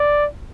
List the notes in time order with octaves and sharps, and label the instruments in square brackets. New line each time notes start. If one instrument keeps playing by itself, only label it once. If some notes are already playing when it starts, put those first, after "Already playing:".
Already playing: [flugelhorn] D5